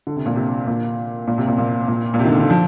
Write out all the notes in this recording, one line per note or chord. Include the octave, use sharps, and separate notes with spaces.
D3
C3
A#2
C3
A#2
A#2
C3
A#2
A#2
A#2
A#2
C3
D#3
D3
D3
F3